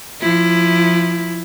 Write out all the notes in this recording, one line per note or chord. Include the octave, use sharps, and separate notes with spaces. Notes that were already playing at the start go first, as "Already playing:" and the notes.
F3 E4